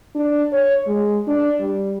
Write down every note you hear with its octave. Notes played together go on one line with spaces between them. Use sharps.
D4
C#5
G#3
D4
G3